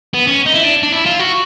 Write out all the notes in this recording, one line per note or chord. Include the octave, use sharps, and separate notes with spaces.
B3
C#4
D#4
E4
D4
D4
E4
F4
F#4